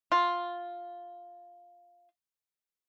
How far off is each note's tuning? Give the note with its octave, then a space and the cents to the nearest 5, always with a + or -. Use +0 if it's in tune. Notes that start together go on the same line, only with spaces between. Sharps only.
F4 +5